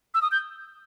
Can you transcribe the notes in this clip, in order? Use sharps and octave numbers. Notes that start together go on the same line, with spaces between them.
E6
D#6
G6